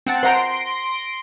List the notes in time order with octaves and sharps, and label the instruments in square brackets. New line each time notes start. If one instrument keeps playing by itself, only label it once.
[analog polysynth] C4 F#5 A5
[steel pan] C5 F#5 A#5 [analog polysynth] C6 A#6 D7